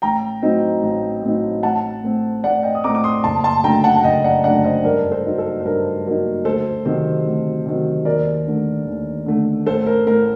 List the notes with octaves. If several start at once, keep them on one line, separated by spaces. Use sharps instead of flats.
A1 G5 A#5
A2 F#3 C4 D#4
A1
A2 F#3 C4 D#4
A1 F#5 A5
A2 A3 C4
A1 D5 F#5
D#5 G5
D#6
A2 A3 C4 A#5 D6
D6
C6 D#6
F#1 A5 C6
A5 C6
F#2 D3 A3 G5 A#5
F#5 A5
F#5
F#1 D#5 G5
D5 F#5
F#2 D3 A3 D5 F#5
C5 D#5
C5
G2 A#4 D5
A4 C5
F#3 A#3 D#4
A4
C5
G2 A#4
F#3 A#3 D#4
D2 A4 C5
C3 D#3 F#3 C4
D2
C3 D#3 F#3 C4
D#2 A#4 D5
D3 A3
D#2
D3 A3
A1 A4 C5
A#4
A2 A3 A#4